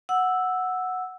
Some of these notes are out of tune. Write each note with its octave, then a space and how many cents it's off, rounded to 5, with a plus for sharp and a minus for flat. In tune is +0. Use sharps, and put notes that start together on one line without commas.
F#5 -5 E6 +0